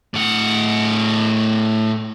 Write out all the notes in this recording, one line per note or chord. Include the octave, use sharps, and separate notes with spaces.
A2 F#5